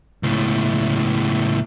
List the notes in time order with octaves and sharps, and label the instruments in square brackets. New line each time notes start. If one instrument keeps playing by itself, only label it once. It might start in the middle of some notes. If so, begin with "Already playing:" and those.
[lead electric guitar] C#2 A2